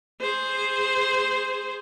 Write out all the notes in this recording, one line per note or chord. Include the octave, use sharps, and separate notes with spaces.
G#4 C5